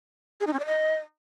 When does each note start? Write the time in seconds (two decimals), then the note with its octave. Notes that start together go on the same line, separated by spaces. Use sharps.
0.40 G#4
0.47 D#4
0.53 C#4
0.60 D5
0.66 D#5